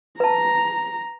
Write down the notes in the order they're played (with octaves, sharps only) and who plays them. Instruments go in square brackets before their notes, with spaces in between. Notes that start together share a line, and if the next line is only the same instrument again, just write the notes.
[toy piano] B4 A5 [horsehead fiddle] A#5